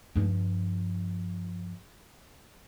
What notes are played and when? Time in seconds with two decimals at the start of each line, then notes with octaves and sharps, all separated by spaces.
0.16 G2 F3